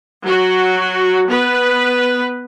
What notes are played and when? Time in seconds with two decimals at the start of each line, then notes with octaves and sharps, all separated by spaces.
0.25 F#3 F#4
1.28 B3 B4